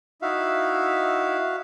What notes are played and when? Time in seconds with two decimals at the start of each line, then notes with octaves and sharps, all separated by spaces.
0.22 D#4 E4 F#4 E5 F5